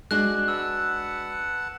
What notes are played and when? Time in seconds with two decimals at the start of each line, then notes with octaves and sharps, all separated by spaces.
0.11 G#3 D4 F#4 F#6
0.48 B4 F#5 A5 E6